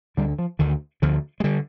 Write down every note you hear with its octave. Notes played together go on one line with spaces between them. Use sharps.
D2 D3 G3
F3
D2 D3 D#3
D2 D3 F3
G#3
D3 G3